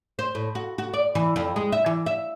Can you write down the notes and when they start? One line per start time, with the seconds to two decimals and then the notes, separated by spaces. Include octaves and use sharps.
0.19 C5
0.35 A2
0.55 F#4
0.78 F#4
0.94 D5
1.15 E3
1.36 F2
1.56 G#3
1.72 E5
1.86 E3
2.06 E5